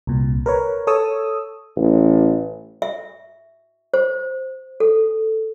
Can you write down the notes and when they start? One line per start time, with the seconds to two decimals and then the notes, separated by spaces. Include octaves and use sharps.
0.07 C2 A#2
0.46 A#4 B4 C#5
0.87 A4 C#5 D#6 E6
1.77 A1
2.82 E5
3.94 C5
4.80 A4